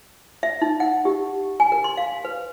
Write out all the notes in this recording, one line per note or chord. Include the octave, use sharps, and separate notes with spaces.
E5
D#4
F#5
G4
G#5
A#4
C6
F5
B4